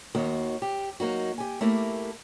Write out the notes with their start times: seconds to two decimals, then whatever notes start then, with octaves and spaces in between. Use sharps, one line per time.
0.15 D#2 D#3 A#3 F#4
0.62 G4
1.00 F#3 A#3 D#4 F#4
1.38 G4 G#5
1.61 A3 A#3 E4 G4 A#4